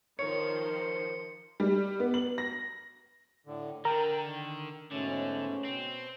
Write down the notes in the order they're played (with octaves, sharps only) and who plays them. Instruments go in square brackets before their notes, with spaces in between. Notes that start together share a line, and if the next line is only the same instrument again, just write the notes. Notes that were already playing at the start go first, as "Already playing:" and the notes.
[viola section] D#3 F3 C5 [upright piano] C#5 [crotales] C#7
[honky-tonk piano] G3
B3
F#7
A#6
[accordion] A2 D3
[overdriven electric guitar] D3 [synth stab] A#4 [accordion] G5
[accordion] D#3
[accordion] G#2 B2 A3 [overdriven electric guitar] D3 [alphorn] C#4
[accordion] B2 [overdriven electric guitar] C4